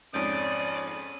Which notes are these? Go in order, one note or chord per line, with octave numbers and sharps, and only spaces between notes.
F2 G#2 C#4 D5 D#6 G6